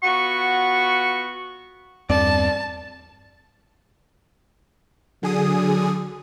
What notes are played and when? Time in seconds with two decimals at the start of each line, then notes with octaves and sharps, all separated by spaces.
0.03 B3 F4 F#4 C#6
2.10 E2 G2 C4 D5 A5
5.23 D3 F#3 G#4 D#6